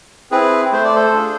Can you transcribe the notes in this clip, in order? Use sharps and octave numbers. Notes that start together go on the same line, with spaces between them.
C4 E4 G#4 B4
A3 C5
D5
A4 C5
D4 F4 G#4